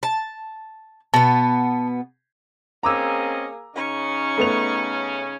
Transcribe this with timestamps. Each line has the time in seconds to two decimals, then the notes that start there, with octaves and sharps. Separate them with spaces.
0.03 A5
1.14 B2 B3 A5
2.83 A#3 C4 C#4 G#4 D#5 A#5 D6 E6
3.75 C#3 C#4 D#4 C#6
4.38 A3 B3 F7